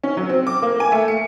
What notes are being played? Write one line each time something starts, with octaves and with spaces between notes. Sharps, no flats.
C#4
F#3
C4
D6
A#3
G#5
A3
C#7